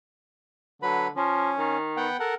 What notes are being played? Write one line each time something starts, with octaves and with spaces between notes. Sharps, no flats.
D3 F#3 B4 B5
F3 C#4
D#3
B3 F#5 G5
A4 A#4 F#5